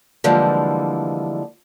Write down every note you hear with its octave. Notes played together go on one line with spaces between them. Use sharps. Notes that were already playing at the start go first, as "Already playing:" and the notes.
D3 E3 F3 G3 G#3 A#3